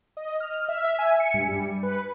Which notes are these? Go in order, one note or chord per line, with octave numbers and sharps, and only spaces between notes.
D#5
F6
E5
E5
G#5
C#7
G2
G3
B4